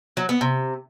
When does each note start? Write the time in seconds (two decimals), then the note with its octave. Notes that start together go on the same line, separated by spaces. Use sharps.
0.17 F#3
0.29 B3
0.41 C3